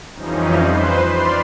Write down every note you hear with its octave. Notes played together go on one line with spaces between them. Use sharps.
F2 E3 F3 G3 C#4 D#4
B4 C5 C6
D5 B5 C6 F6 C7